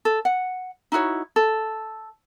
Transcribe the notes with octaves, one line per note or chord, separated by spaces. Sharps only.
A4
F#5
D#4 E4 F#4 C#5
A4